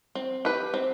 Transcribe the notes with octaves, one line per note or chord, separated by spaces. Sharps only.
C4
G4 B4
C4